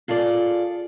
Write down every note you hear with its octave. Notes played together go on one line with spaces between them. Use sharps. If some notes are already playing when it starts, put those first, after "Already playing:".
F4 G#4 A4 D5